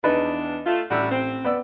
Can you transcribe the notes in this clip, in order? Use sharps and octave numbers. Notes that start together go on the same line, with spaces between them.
E2 D4 D#4 B4
A3 F4
A1 G3 D4 F#4 E6
C4
B3 D5 E6